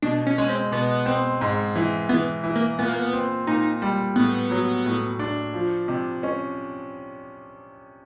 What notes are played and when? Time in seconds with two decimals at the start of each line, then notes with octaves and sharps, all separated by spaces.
0.02 B2 D4
0.27 C#4
0.38 G#3 C#4
0.49 C4
0.72 B2 B3
1.06 C4
1.41 G#2
1.75 E3
2.09 E3 B3
2.44 E3
2.55 A#3
2.78 A#2 B3
2.89 A#3
2.99 B3
3.13 C4
3.47 A#2 D#4
3.82 G3
4.16 A2 B3
4.51 F#3
4.86 A2
5.19 D4
5.54 F3
5.88 C3
6.23 C#4